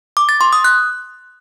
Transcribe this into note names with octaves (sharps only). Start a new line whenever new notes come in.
D6
A6
C6
D#6
F#6